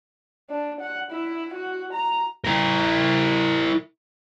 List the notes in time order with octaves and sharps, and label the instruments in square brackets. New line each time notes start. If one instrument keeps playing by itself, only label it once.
[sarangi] D4
F#5
E4
F#4
A#5
[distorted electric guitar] E4 A#4